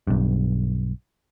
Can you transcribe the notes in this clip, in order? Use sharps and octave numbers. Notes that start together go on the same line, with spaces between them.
B1 G2